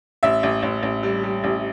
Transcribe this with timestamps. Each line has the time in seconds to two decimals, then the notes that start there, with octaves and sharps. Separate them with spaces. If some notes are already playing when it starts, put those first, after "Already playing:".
0.23 A1 E5
0.43 A1
0.63 A1
0.83 A1
1.03 G3
1.24 G3
1.44 A1